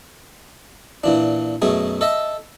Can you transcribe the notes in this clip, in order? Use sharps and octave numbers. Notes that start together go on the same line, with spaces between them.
A#2 E3 D4
F#2 B2 A3 G#4
A4 D#5 E5 A5